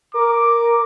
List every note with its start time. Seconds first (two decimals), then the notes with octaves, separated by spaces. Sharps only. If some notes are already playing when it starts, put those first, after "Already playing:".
0.14 A#4 D6